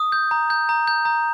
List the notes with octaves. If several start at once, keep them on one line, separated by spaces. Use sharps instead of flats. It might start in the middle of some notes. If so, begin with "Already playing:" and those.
Already playing: D#6
G6
A#5
G6
A#5
G6
A#5